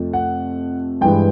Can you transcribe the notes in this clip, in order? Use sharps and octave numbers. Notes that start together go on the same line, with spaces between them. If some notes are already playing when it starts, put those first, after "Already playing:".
Already playing: F2 C3 F3 A3
F#5
G2 E3 G#3 G5